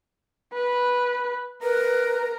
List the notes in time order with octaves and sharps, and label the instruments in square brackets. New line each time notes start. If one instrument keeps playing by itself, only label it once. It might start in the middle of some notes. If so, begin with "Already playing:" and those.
[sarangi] B4
[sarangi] A#4 [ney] B4